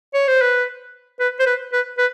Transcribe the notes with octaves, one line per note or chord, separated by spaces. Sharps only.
C#5
C5
B4
B4
C5
B4
B4
B4